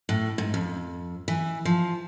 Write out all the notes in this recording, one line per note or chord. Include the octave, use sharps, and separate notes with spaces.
A2
G#2
F2
E3
F3